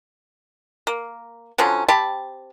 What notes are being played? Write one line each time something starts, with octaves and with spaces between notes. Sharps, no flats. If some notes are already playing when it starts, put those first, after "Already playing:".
A#3
D3 F3 F#3 C#4
C4 G4 A5 B5